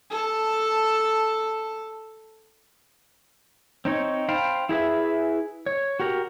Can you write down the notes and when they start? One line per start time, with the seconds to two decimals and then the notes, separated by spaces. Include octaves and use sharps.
0.10 A4 A5
3.85 C4 D#4 C#5
4.29 C5 F5 G5 A5 B5
4.69 E4 G#4 B4 E5
5.66 C#5
6.00 F#4 G4 A#4